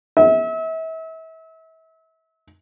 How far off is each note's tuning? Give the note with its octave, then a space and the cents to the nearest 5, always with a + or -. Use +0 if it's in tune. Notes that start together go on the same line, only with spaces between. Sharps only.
E5 -35